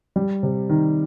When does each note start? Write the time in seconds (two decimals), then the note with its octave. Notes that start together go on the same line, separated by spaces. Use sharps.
0.16 G3
0.43 C3
0.70 D#3